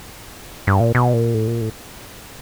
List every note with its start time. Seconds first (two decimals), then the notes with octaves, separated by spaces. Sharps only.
0.67 G2
0.80 A#2
0.95 B2
1.14 A#2
1.34 A2
1.47 A#2
1.61 A2